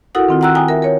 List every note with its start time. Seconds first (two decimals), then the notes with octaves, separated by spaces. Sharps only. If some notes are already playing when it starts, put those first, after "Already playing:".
0.15 E4 F#4 A4 A#4 F#5 D#6
0.28 D#3 C4 F4
0.41 F#5 G5 A#5 E6 F#6
0.55 G5 G#5 A#5 D#6
0.68 A#4 E5
0.82 A#4 C#5